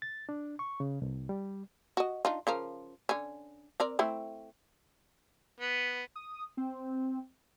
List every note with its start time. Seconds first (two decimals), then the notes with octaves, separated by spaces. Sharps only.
0.02 A6
0.29 D4
0.59 C#6
0.80 C#3
1.02 C2
1.29 G3
1.97 F#4 D#5
2.25 D4 D#4 F4
2.47 C#3 F3 A#4
3.09 D3 C#4
3.80 C4 A#4 D5
3.99 A3 C4 E4
5.60 B3
6.16 D#6
6.57 C4